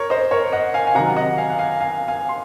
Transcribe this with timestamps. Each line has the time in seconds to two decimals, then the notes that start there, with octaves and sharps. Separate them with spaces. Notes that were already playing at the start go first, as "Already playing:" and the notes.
Already playing: A#4 C#5
0.10 C5 D#5
0.31 A#4 C#5
0.52 D#5 F#5
0.74 F5 G#5
0.87 G#5
0.95 C3 D#3 F#3 F#5 A#5
1.17 D#5 F#5
1.38 F5 G#5
1.50 F#5
1.59 F5 G#5
1.80 F5 G#5
2.08 F5 G#5
2.29 C6